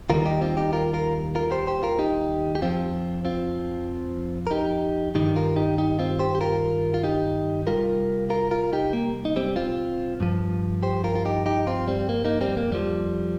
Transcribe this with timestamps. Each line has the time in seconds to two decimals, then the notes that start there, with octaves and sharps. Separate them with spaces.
0.10 D#2 D#3 G3 F4 A#4
0.26 D#4 G4
0.41 C4 F4
0.57 D#4 G4
0.73 F4 A#4
0.93 F4 A#4
1.35 F4 A#4
1.51 G4 C5
1.67 G4 C5
1.83 F4 A#4
1.99 D#4 G4
2.55 G4
2.62 F2 F3 C4 F4
3.25 C4 F4
4.47 A#4
4.51 D#4 G4
5.15 G2 D#3 G3 D#4 G4
5.36 F4 A#4
5.56 D#4 G4
5.78 D#4 G4
5.99 C4 F4
6.19 G4 C5
6.35 G4
6.41 F4 A#4
6.94 F4
7.03 D#4 G4
7.67 C2 A#2 G3 F4 A#4
8.30 F4 A#4
8.51 F4 A#4
8.73 D#4 G4
8.93 A#3
9.25 D#4
9.36 G3 C4
9.56 C4 F4
10.20 G2 F3
10.83 G4 C5
11.04 F4 A#4
11.15 F4
11.25 D#4 G4
11.46 D#4 G4
11.67 C4 F4
11.88 G3 C4
12.09 A#3
12.25 A#3 D#4
12.41 G3 C4
12.57 A#3
12.72 F2 F3 G3